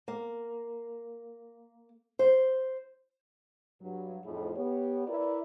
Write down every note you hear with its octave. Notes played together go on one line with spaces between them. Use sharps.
A#3
C5
G2 F#3
F2 A2 F3 D#4 E4 G#4
B3 G4 C#5
E4 A#4 B4 D5